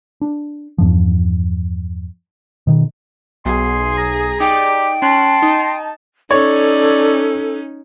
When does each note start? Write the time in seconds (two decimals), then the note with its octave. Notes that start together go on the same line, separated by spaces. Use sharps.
0.21 D4
0.78 E2 G2 F3
2.67 B2 D#3
3.46 B1 G#4 C6
3.98 A#5
4.40 D#4 G4 D5 G5
5.02 C#4 A5 C6 F#6
5.42 D#4
6.31 C#4 D#4 A4 C#5 D5